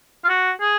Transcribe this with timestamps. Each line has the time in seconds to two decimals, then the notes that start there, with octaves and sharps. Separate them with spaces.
0.24 F4
0.29 F#4
0.61 G#4